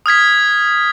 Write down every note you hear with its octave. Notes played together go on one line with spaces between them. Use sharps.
D#6 F6 G#6 B6